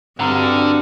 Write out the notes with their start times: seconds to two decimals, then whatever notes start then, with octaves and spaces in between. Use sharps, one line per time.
0.19 G2 D3 C4 D4 F#4 F#5 A#5 F6